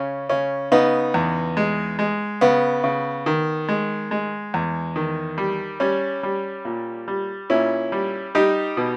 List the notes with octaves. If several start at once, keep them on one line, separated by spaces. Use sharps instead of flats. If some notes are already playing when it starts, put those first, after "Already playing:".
Already playing: C#3 C#4
C#3 C#4
C#3 B3 D#4
E2
G#3
G#3
C#3 B3
C#3
D#3
G#3
G#3
E2
D#3
G3
G3 C#4
G3
A#2
G3
A#2 C#4 E4
G3
G3 D#4 G4
B2